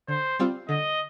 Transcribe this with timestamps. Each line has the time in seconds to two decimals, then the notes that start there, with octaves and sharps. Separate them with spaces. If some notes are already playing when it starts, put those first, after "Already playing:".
0.08 D3 C5
0.39 G3 C4 F4
0.69 D3 D#5